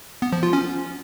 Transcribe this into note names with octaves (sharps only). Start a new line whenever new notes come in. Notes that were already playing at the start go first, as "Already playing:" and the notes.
B3
F3
F4
C#4